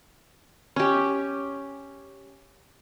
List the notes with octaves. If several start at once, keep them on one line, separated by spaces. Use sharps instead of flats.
C#4 G4